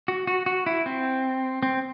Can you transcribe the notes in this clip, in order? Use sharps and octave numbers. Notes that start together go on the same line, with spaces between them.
F#4
F#4
F#4
E4
C4
C4